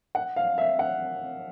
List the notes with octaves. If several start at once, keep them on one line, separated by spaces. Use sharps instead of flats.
F#5
F5
E5
F#5